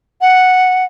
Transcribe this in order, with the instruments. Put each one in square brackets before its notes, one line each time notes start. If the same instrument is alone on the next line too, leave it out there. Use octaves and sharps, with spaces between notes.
[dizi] F#5